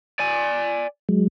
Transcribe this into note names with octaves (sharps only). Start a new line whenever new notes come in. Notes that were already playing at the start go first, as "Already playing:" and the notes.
D5 G#5
F#3 G#3